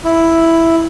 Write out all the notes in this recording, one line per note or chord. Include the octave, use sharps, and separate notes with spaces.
E4